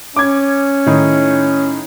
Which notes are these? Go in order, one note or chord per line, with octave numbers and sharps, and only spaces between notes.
C#4 D6 G#6
A2 D#3 D#4